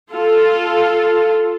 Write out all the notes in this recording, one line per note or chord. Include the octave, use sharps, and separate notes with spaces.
F4 A4